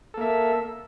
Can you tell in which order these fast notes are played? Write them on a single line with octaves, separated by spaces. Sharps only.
A4 A#3 E5